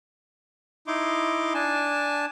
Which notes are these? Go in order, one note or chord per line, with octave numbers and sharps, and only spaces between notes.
D#4 E4 C6 D6
D4 G#5 A5